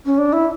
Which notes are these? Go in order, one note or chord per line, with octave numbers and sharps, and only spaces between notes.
C#4
D4
E4